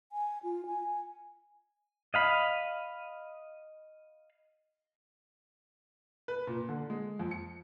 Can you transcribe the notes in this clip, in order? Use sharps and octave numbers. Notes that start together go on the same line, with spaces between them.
G#5
F4
G#5
D#5 F5 B5
B4
A#2
D3
G#3
F2
C#7